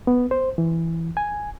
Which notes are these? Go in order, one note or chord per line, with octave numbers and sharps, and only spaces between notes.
B3
C5
E3
G#5